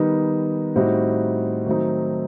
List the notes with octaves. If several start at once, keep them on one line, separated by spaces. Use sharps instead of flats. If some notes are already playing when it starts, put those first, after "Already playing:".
Already playing: D#3 G3 B3 D#4
A2 G3 C4 D#4 F#4
D#3 F#3 A3 C4 D#4